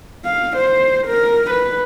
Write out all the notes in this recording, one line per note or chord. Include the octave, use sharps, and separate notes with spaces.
F5
C5
A#4
B4